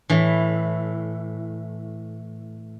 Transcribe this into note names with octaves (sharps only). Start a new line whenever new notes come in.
A2 E3